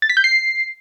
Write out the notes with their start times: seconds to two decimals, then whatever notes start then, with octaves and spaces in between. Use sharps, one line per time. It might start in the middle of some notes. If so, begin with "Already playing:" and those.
0.02 A6
0.10 B6
0.17 G6
0.24 C7